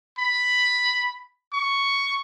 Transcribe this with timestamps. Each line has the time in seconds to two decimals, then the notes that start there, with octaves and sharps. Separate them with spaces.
0.19 B5
1.53 C#6